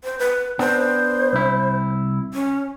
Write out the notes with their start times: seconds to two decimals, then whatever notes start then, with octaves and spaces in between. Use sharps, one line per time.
0.04 C5
0.19 B4
0.59 B3 D4 C5
1.33 C2 E4
2.34 C#4